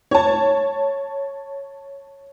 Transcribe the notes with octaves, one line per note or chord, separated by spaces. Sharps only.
C#5 A5